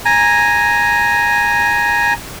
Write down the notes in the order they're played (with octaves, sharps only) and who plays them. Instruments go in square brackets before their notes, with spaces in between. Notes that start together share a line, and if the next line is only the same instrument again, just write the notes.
[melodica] G#5 A#5